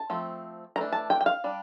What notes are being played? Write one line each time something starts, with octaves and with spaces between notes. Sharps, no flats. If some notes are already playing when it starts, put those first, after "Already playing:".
Already playing: A5
F3 A3 C4
E3 A3 D4 A#5
A5
G5
G5
F5
G3 D4